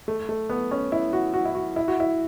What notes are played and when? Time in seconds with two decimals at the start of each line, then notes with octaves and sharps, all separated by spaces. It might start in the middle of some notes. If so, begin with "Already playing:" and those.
0.08 A3
0.29 A3
0.50 B3
0.71 C#4
0.92 E4
1.13 F#4
1.34 F#4
1.45 E4
1.55 F#4
1.76 E4
1.88 F#4
2.00 E4